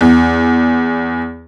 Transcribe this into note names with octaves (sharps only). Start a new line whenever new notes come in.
E2